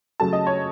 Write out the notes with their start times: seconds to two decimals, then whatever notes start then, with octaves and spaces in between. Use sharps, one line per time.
0.20 C#3 F#3 A3 A5
0.33 D#5
0.47 C#5